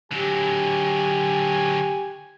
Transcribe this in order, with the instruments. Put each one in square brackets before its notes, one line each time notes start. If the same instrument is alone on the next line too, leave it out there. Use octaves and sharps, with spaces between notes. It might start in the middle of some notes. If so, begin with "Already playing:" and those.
[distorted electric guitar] D3 F#3 [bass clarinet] G4 [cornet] G#5